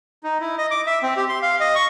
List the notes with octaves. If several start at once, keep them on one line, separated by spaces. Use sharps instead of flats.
D#4
E4
D#5
D6
E5
C4
G4
C6
F5
D#5
C#6